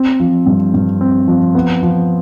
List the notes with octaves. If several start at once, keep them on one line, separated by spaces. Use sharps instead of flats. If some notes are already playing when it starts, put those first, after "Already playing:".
Already playing: C4
F3
G2
G2
C4
F3
B3
F3